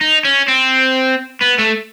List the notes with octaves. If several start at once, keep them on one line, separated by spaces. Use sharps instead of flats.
D#4
C#4
C4
B3
A3